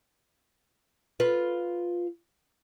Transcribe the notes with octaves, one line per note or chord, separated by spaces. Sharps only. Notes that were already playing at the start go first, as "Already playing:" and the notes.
F4 B4